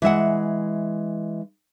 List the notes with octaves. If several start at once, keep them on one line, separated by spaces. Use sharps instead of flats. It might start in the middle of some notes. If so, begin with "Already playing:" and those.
E3 G#3 E5 F#5